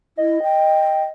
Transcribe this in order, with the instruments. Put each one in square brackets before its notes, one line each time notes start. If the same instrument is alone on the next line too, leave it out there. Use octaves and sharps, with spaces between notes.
[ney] E4 [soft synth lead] D#5
[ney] G5